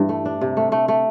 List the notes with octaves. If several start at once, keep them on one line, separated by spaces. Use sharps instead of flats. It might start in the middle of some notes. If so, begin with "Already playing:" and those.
Already playing: G2 E3
A3
D4
C3
A3
A3
A3